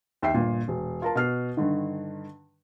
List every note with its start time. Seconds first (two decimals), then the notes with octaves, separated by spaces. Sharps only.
0.22 D#2 E5 G5 C7
0.34 G1 A#2
0.68 E1
1.02 F4 A#4 A5
1.15 B2 F6 C7
1.57 G2 D3 D#3